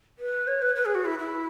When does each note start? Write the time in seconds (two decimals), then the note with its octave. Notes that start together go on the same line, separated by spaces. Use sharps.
0.19 B4
0.47 C#5
0.62 B4
0.75 B4
0.85 G#4
0.95 F#4
1.05 E4
1.19 E4